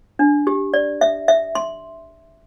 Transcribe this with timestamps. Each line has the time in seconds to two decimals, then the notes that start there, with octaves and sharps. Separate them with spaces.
0.19 D4
0.47 G4
0.74 D5
1.01 E5
1.28 E5
1.55 C6